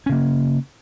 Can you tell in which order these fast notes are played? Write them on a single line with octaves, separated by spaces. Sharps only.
C#4 C#3 A#3